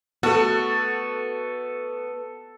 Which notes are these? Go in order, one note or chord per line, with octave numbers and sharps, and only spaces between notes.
A3 B3 F#4 A4